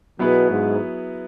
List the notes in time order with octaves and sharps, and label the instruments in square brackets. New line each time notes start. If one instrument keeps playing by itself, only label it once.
[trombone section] B2 [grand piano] F#3 B3 E4 G#4 B4
[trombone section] G#2